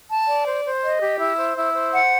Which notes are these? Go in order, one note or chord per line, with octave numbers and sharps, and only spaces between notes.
A5
D5
C5
C5
D#5
G4
E4
C5
E4
C5
F#5